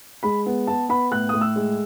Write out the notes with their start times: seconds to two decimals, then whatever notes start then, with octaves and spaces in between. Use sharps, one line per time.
0.23 G#3 B5
0.46 B3
0.67 B3 A5
0.89 B3 B5
1.11 A2 F#6
1.29 A2 D#6
1.41 E6
1.56 G#3